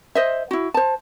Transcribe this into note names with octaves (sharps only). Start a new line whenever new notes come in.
C5 D#5 E5
E4 F#4
C5 A5